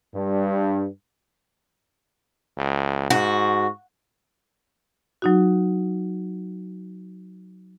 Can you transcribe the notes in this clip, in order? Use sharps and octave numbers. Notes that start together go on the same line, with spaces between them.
G2
C#2
G#2 F#4
F#3 D#4 F#4